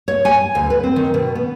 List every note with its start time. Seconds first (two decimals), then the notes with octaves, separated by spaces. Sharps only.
0.08 C#5
0.25 G#5
0.55 D2
0.70 B4
0.84 C4
0.96 D#3
1.14 B2
1.35 B3